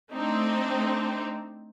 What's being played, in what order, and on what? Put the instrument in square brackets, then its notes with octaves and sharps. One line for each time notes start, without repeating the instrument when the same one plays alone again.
[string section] A3 C4 D4 D#4